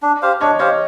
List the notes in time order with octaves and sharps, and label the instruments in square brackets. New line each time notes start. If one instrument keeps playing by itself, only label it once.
[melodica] D4
G4 C5 F5
[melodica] D4 [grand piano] C#5 D#5
[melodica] G4 C5 F5 [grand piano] C#5 D#5